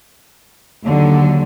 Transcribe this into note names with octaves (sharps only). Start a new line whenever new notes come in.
D#2 D3 F#3